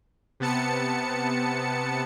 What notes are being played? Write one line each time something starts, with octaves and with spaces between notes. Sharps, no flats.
C3 B3 A5 C#7